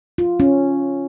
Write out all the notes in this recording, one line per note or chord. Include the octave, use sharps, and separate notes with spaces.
F4
C#4